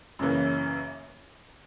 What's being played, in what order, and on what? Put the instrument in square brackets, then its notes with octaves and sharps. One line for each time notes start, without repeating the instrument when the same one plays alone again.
[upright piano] F#2 C#3 E3 A#3